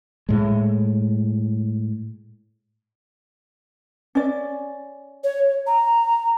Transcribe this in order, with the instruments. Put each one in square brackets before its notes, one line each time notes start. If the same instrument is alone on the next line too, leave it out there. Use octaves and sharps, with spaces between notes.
[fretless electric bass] A2 G#3
[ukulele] C#4 D5
[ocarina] C#5
A#5